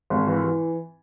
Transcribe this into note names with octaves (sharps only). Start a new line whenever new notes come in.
G#1
E3
E3